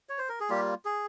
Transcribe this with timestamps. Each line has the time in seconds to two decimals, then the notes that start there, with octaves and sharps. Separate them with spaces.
0.09 C#5
0.18 C5
0.29 A#4
0.40 G#4
0.50 G3 A#3 F4 G4
0.85 G#4